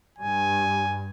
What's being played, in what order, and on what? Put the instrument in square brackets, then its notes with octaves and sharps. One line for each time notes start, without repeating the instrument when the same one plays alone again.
[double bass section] G2 [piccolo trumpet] G#5